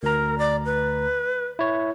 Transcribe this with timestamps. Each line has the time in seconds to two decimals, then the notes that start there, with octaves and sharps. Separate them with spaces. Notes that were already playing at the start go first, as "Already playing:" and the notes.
0.03 D2 A#4 A#5
0.38 D5
0.65 B4
1.59 E4 C#5